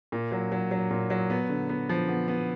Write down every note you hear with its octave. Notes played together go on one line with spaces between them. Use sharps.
A#2
F#3
F#3
F#3
A#2
F#3
B3
D3
B3
F3
B3
B3